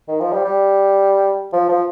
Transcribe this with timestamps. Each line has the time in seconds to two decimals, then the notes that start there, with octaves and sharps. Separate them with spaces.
0.08 D#3
0.20 F3
0.33 G3
0.44 G3
1.53 F3
1.69 F3